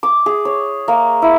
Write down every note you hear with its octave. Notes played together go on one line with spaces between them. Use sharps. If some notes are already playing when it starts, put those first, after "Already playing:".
D6
G#4
C#5
A#3
E4